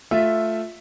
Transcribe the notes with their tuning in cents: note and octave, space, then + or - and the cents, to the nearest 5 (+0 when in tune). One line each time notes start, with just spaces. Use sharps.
A3 +0 F4 +0 E5 +0